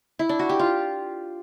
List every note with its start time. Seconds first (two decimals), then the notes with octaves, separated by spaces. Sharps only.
0.19 E4
0.29 D4
0.39 F#4
0.49 G4
0.59 F4